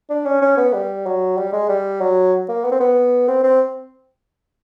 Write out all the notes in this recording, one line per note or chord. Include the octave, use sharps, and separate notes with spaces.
D4
C#4
C#4
B3
G3
F#3
G3
G#3
G3
F#3
A#3
B3
C4
B3
C4
C4